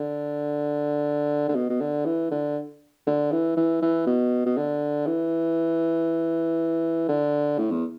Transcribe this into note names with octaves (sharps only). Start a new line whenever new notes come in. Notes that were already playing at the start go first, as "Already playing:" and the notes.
Already playing: D3
D3
B2
B2
D3
E3
D3
D3
E3
E3
E3
B2
B2
D3
E3
D3
A2
E2